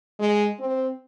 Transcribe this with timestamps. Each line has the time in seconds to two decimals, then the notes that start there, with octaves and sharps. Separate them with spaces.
0.19 G#3
0.60 C4